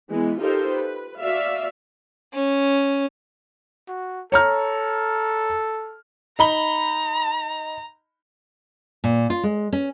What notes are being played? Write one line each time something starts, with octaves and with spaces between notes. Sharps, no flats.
E3 G#3 B3
D#4 F4 G4 A4 A#4 C5
B4
F#4 D5 E5 F5
C#4
F#4
A4 C#5 A#5 F6
D#4 A#5 B5 G7
A#2
F4
G#3
C#4